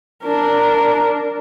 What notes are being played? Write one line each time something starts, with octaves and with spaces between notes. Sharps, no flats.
D4 A#4